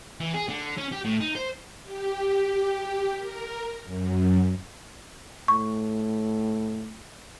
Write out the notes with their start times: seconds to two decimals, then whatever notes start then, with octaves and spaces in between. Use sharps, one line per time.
0.20 E3
0.34 G#4
0.48 D3
0.78 C#4
0.92 G4
1.05 A2
1.20 D#4
1.35 C5
1.83 G4
3.18 A#4
3.85 F#2
5.48 A2 C#6